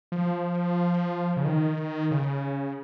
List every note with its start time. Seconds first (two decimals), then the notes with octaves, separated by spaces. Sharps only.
0.12 F3
1.37 C#3
1.45 D#3
2.11 C#3